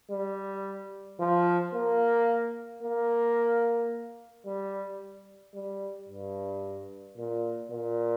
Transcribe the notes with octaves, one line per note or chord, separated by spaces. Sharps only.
G3
F3
A#3
A#3
G3
G3
G2
A#2
A#2